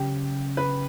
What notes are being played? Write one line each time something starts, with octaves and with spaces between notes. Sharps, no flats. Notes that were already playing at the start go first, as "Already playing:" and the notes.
Already playing: C#3 F#3 C#4 G4
B4